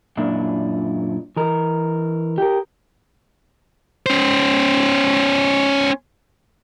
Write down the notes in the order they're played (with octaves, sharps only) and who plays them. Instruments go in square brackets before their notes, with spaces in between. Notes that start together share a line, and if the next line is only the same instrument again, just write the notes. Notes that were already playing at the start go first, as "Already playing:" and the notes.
[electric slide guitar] F#2 A#2 D4 E4
E3 A#4
G4 A#4
[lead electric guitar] C#4 C5